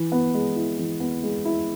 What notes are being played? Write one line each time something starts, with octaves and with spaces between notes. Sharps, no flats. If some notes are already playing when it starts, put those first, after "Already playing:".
Already playing: E3
B3
G#3
E4
E3
B3
G#3
E4